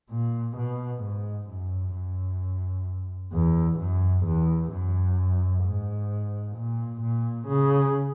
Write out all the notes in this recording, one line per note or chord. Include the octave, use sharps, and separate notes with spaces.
A#2
B2
G#2
F#2
F#2
E2
F#2
E2
F#2
G#2
A#2
A#2
C#3